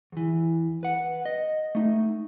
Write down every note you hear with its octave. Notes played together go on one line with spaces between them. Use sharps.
E2 E3
B4 F#5
D#5
A3 D#4